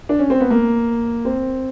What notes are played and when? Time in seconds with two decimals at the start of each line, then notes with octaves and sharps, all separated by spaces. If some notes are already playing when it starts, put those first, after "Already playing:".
0.09 D4
0.19 C#4
0.30 C4
0.41 B3
0.50 A#3
1.25 C4